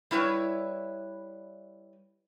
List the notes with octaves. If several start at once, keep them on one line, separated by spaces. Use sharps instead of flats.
G3 E4 B4 C#5